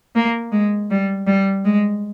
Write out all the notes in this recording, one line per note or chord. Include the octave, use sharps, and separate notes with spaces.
A#3
G#3
G3
G3
G#3